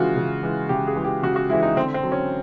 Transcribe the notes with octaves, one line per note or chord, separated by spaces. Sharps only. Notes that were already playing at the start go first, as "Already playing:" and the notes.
Already playing: C#3 E3 G#3 F4 F#4
C#3
E3 G#3
C#3 G4
G#4
E3 G#3
G4
C#3 F#4
F#4
E3 G#3 E4
D#4
D3 C4
C4
F#3
C#4